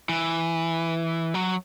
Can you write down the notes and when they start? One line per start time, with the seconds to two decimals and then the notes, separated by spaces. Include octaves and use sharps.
0.09 E3
1.34 F#3